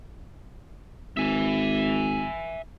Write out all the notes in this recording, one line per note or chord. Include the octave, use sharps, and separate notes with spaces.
G#1 E5 G#5